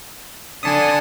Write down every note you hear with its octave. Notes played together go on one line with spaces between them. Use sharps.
D3 G#5 A5 D#6